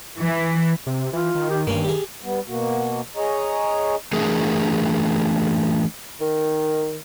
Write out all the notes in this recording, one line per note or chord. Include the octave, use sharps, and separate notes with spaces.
E3
C3
E3 F4
D#3
G4
G2 D#3 A#3 C#4
G4 G#4
G3 B3
B2 A#3 F#4
G#4 C#5 D#5 A#5
E3 A3 D4 G#4 A#4
D#3